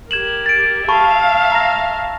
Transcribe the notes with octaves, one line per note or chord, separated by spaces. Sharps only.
G4 A#4 G#6 E7 F#7
A6 D7
E5 F5 A5 B5 C#6
A#5 A#6